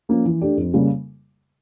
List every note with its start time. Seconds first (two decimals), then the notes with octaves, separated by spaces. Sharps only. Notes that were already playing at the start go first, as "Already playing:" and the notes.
0.09 F3 A#3 C#4
0.25 E3
0.42 A3 D4 G4
0.57 F2
0.74 C#3 G3 A#3